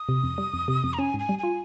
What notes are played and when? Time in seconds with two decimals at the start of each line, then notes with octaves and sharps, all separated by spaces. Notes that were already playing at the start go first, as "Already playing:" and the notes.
Already playing: D#6
0.09 C3
0.23 F2
0.38 G3
0.54 F2
0.68 C3
0.84 F2
0.93 A#5
0.99 C#4 G#5
1.14 G#2
1.19 G#5
1.29 G3
1.39 F4 G#5